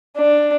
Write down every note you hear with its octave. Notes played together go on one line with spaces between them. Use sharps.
D4